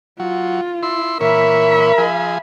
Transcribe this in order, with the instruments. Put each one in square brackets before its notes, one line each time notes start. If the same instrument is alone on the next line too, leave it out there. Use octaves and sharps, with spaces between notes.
[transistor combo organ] F#3 [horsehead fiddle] F4
[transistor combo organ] E4 C6
[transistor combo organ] A#2 E3 C#5 [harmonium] A#4 [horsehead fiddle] E5 B5
[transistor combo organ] F3 G#4